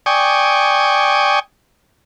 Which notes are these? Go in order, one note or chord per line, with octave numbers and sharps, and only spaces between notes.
D5 G5 G#5 C#6 D#6